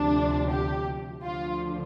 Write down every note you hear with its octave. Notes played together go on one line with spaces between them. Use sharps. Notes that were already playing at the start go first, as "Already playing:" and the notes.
Already playing: D2 C3 F3 D4
G4
D2 D3 F3 F4